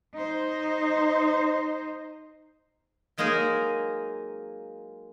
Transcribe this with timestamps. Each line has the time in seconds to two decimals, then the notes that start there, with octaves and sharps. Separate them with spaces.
0.14 D#4 C5
3.18 F#3 G#3 A#3 D#4 G#4 A#4